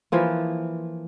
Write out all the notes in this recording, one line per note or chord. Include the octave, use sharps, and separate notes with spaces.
E3 F3 A#3